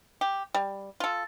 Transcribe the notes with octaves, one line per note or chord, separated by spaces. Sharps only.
G4
G3
F4 A4